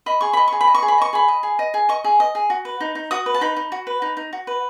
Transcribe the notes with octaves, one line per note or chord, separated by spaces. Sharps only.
D#5 B5
G#4 C#6
D#5 B5
G#4 C#6
B5
D#5
C#6
G#4
B5
D#5 C#6
G#4 B5
D#5
G#4
D#5
G#4
D#5 C#6
G#4
D#5
G#4
F#4
B4
D#4
D#4
F#4 D#6
B4
A5
D#4 B5
D#4
F#4
B4
D#4
D#4
F#4
B4